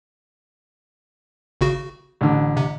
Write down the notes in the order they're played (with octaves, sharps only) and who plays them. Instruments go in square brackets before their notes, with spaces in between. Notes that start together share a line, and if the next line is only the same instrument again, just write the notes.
[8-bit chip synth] G#1 C#3 F#4
[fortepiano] A1 D3
[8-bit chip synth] C3